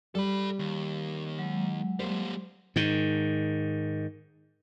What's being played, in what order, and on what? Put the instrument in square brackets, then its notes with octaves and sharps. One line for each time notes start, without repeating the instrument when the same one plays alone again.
[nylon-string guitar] G3 [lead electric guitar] A4 B5
[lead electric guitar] D#2
[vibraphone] F#3 G#3
[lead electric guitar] G3 A#3 [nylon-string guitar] C5
[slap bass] G#2 D#3